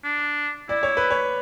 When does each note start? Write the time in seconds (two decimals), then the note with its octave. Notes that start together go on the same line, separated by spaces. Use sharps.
0.04 D4
0.69 E4 D5
0.83 C#5
0.97 B4
1.11 C#5